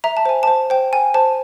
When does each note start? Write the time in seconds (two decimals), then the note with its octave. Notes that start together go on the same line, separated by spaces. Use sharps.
0.04 E5 A#5
0.17 A5
0.25 C5 G#5
0.43 C5 A5
0.70 C5 G5
0.93 G5 G#5
1.14 C5 A5